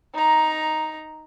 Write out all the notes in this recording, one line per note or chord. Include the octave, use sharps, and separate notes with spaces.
D#4 A#5